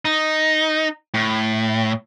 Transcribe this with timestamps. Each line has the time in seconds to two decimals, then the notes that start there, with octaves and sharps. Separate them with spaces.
0.05 D#4
1.14 A2